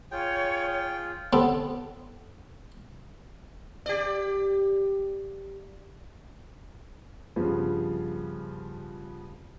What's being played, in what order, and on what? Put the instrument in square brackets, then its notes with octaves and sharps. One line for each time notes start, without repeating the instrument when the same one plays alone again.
[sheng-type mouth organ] F4 G#4 [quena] C#5 [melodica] G5
[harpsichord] B3 C4 A4
[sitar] G4 D5
[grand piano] G2 C#3 F3 B3